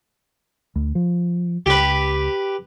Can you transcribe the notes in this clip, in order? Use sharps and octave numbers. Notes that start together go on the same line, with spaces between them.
D2
F3
C#2 G4 B4